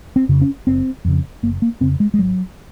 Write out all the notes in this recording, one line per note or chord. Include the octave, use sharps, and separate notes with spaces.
C4
F2 C#3
C#4
F#1 C4
F2 C#3
F#1 A#3
A#3
F2 C#3 C4
G#3
G#3
G#1 F#3